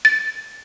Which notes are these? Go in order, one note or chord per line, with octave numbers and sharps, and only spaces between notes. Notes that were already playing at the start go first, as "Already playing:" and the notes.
A6